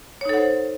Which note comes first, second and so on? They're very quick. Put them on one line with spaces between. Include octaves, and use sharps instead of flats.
C#5 D#4 A4 F#5 C5